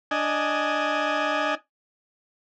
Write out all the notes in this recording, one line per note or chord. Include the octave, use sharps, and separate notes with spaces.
D4 D#5 G#5